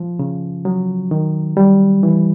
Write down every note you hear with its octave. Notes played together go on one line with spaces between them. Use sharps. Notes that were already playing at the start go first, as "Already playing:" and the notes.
Already playing: F3
C#3
F#3
D#3
G3
E3